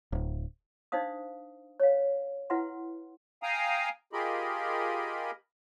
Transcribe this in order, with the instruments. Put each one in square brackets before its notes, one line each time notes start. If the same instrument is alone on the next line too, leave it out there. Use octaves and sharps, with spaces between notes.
[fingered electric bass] D1
[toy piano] D4 D#4 C5 F5 D#6
C#5 F5
E4 B4 E5 F#5 C6
[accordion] F5 G5 G#5 A#5 D#6
F4 G4 G#4 A#4 D#5 B5